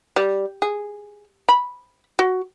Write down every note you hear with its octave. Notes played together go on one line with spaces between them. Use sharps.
G3
G#4
B5
F#4